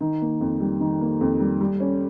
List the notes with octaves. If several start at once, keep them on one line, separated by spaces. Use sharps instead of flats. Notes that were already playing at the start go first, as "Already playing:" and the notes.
D#3
A#3
F2
G3
D#3
A#3
F2
G3
G3
C#4